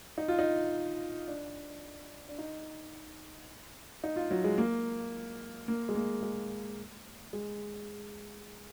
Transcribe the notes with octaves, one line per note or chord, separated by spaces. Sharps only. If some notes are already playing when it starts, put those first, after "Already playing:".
D#4
F4
D#4
D4
D4
D#4
D#4
F4
F#3
G#3
A#3
A#3
G#3
A#3
G#3
G#3